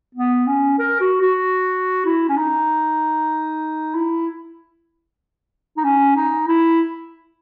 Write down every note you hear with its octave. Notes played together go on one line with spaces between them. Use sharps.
B3
C#4
A#4
F#4
F#4
E4
C#4
D#4
E4
D#4
C#4
D#4
E4